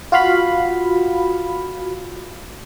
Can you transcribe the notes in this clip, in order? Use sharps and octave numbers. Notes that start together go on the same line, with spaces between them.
F4 F#4 F5 B5